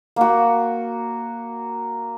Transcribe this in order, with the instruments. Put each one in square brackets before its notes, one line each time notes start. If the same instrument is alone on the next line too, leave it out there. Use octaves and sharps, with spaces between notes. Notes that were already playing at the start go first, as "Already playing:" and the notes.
[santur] A#3 F#4